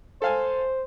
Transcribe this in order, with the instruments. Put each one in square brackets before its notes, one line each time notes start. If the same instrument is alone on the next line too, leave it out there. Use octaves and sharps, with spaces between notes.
[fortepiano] A4 F5 G#5 [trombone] C5